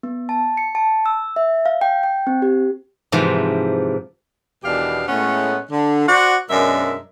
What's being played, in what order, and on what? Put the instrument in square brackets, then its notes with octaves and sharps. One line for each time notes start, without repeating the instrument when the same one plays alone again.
[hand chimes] B3
A5
C#7
A5
E6
E5
F5
G5
G5
C4
G4
[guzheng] G#2 C3 E3 F3
[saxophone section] E2 B2 D#3 D4 G4 F5
A2 G#3 A3 B3 C#4
D3
F#4 C5 D5 F#5
F#2 B2 G#3 D4 A#4 E5